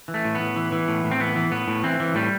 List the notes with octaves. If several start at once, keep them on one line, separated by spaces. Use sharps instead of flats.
E3
A3
A2
B3
A2
E3
E3
A2
A2
C4
E3 B3
E3
A2 B3
A2
E3 C4
E3
A2 G3